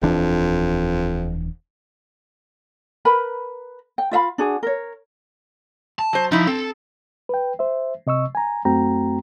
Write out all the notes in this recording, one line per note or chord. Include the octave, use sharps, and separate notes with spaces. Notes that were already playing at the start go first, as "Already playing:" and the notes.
D#1 F2 E3 D4
A#4 B4 B5
G5
F4 E5 F5 B5
D4 F#4 G#4
A#4 C#5
A5
F#3 C5
F3 D#4 E4
C4 A4
B4 G5
C5 E5
C3 D#5 C#6 E6
G#5 A#5
F#2 A3 C4 F#4 G5 A#5